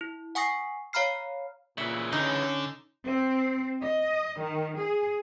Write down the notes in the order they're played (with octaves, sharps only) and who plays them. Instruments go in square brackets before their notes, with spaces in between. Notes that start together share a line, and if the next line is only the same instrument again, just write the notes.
[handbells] E4
F#5 G#5 C#6 D#6 A#6 C7
C#5 F5 A#5 B5 F6 C7
[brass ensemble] A#2 [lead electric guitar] C#3 E3 [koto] E5
[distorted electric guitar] D3 [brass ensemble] C#4 [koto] D#4
[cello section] C4
D#5
D#3
G#4